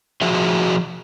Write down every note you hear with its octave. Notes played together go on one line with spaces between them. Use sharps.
F3 F#4 G#4 E5